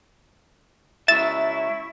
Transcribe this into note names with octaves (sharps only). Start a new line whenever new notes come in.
C#2 E4 E5 C#6 A6 E7